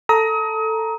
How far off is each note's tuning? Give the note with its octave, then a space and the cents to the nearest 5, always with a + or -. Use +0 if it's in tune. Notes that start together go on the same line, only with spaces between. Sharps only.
A4 +10 A#5 +10 D#6 +35